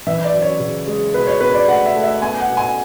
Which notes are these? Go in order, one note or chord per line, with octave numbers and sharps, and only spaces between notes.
E3 E5
D5
F#2
C#5
C#3
G#3
B2 B4
C#5
B2 B4
D5
A3 F#5
E5
A3
E5
B3 G#5
F#5
B2
G#5